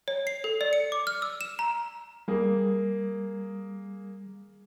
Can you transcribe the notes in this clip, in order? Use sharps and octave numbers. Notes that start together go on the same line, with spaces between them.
C#5
C7
A4
D5
C#7
D6
F6
E6
E7
A#5
G3 A#3 G#4